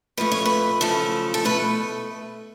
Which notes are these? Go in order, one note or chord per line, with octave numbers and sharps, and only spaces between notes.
F2 F3 A3 B4
C#5
B4
F#2 C#3 F3 A3 A4
A4
B2 A3 B4